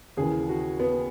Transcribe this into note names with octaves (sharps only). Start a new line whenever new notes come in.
D#2 C#3 E3 G#4
F#4
B3